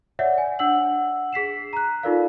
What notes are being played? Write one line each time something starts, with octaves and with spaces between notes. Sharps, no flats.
C#5 D5 E5 F#5
G#5
D4 F#5 E6 F#7
G#4 B6 C7 E7
A#5 F#6
D#4 F4 A4 A#4 D5 F5